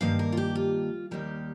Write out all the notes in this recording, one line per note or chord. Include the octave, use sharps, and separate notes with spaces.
G2 D#3 A#3 F5
A#4
F4
G4
F4
D#2 D#3 G3 A#3 G4